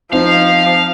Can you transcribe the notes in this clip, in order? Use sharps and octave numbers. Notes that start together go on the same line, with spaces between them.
F3 C4 D#4 F5